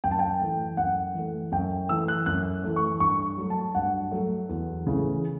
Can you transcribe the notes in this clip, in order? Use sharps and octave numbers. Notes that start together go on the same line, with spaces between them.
F#2 G5
A5
G5
E3 A3
F#2 F#5
E3 A3
F#2 G5
E3 A3 E6
F#6
F#2 F#6
E3 A3
C#6
G2 C#6
F#3 A3
A5
G2 F#5
F#3 A3
E2
C#3 E3 A3